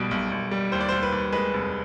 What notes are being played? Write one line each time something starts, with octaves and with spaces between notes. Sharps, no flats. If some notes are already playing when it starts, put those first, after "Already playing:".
Already playing: B1 B2 G3
B1
B1
G3
D#2 C5
D5
C5
D#2
B4
D#2
G#3 B4
F1